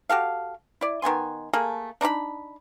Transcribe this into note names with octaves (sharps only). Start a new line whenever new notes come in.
F#4 G4 A4 F5
E4 D5
D#3 B3 G#5 C6
A3 A#3 G#4 A4
D4 D#4 C5 B5